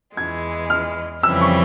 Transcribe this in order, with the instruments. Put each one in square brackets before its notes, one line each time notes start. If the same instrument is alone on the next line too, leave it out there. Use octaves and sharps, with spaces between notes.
[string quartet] E2 E3 G#3 [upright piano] G#6
[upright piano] F6
[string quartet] F2 C#3 E3 G3 C4 [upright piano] E6
[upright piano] C#6